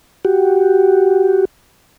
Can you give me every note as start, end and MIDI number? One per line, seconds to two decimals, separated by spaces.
0.25 1.45 66
0.25 1.45 67